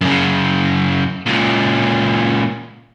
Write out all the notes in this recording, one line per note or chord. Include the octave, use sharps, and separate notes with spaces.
F#2 C#3
C#2 A#2